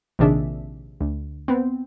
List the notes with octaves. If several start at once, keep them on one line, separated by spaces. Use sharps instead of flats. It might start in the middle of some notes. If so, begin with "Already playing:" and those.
A#1 C3 D#3 D4 G#4 E5
D2
B3 C4